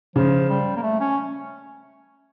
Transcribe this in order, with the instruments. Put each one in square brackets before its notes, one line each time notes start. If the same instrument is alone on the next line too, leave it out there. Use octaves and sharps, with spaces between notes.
[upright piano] C#3 [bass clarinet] F3
[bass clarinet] G3
A#3
A3
C#4